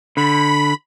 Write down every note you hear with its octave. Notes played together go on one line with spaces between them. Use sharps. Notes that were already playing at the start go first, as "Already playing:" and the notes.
D3 B5